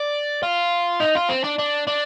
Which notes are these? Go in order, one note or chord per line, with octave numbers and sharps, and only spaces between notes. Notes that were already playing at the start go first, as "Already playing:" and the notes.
Already playing: D5
F4
D#4
F4
C4
D4
D4
D4